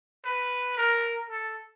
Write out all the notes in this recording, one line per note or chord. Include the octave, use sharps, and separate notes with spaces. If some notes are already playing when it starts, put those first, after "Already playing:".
B4
A#4
A4